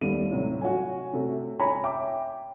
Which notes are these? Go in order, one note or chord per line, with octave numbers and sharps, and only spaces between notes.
D#2 G3 A3 B3 D5 D#7
A2 C3 F#3
F#4 C#5 G#5
C3 A3
C#5 G#5 A#5 B5
E5 G5 D6